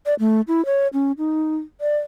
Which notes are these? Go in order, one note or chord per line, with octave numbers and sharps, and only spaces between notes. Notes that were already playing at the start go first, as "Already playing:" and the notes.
D5
A3
E4
C#5
C#4
D#4
D5